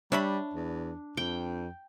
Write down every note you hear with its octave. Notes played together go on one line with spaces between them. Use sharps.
G3 D4 C#5 E5 B5
E2
F2 G5